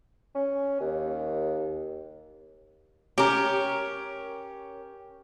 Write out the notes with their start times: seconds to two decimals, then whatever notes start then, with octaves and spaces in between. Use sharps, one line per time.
0.35 C#4
0.80 D#2
3.18 C#4 G4 A#4